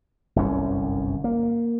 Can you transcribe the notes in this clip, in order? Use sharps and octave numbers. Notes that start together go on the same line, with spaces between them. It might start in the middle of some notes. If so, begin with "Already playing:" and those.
G1 C2 F#2 C#4
A#3